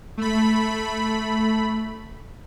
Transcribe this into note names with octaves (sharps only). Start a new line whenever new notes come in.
A3 B5